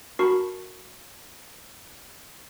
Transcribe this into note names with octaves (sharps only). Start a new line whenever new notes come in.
F#4 A#4 A5 B5 C#6 C7